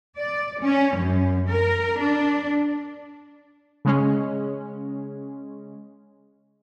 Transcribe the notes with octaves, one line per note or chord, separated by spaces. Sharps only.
D5
C#4
F#2
A#4
D4
C#3 G#3 C#4